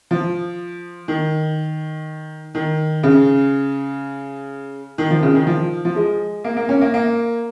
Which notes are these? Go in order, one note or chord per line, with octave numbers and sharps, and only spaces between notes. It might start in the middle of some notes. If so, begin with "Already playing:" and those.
F3
D#3
D#3
C#3
D#3
F3
C#3
D#3
F3
F3
G#3
A#3
A#3
C#4
A#3
A#3